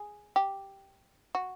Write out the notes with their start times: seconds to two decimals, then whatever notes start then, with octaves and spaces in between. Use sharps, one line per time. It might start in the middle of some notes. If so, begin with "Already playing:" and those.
Already playing: G#4
0.36 G4
1.35 F#4